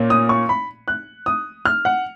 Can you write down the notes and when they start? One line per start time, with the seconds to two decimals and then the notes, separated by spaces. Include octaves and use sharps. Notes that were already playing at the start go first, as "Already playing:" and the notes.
Already playing: A#2 A#3 C#4
0.10 D#6
0.29 C#6
0.49 B5
0.88 F#6
1.26 D#6
1.65 F6
1.85 F#5